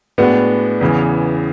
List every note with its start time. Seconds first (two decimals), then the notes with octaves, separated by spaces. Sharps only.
0.18 A2 G#3 B3 D4 F#4
0.81 E2 C#3 E3